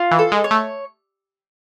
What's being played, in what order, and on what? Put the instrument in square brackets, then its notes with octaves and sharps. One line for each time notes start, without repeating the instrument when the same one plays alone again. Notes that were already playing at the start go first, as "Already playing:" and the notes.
Already playing: [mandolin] F4
[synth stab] E3
[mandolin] A4
[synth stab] G#3
[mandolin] C#5
[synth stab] A3